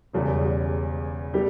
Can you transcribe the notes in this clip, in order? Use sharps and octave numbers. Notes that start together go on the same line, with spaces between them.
E1 E2 C#3 G3
G3 B3 E4 G4